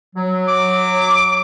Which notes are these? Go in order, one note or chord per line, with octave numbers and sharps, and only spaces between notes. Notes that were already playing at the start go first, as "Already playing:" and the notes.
F#3
D6